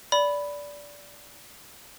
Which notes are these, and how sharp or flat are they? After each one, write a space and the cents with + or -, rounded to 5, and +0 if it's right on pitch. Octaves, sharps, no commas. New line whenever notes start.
D5 -15 B5 +0